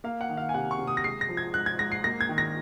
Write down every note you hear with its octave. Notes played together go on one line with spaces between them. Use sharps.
A#3 F5
F#5
D#3
F5
G#5
C3 F#5
C#6
C3
D#6
A#6
G#3 C7
A#6
F3
G#6
G#2 F#6
G#6
G#2 A#6
C7
A#3 A#6
G#6
D#3
A#6